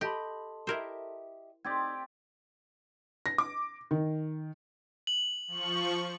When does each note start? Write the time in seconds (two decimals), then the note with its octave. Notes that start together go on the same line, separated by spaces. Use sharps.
0.01 G4 A4 D#5 A5 B5 C6
0.67 E4 G4 A#4 C5 D#5 E5
1.65 C4 D#4 G4 D5 G#6
3.26 A#6
3.38 D6
3.91 D#3
5.07 F#7
5.48 F3 C#6